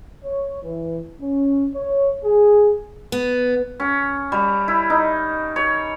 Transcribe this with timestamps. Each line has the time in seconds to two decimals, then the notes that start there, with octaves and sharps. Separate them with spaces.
0.24 C#5
0.63 E3
1.20 C#4
1.75 C#5
2.24 G#4
3.12 B3
3.80 C#4
4.32 G3
4.68 E4
4.90 D#4
5.56 C#5